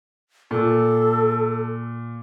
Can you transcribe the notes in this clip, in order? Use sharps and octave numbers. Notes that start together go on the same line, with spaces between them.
A#2 A4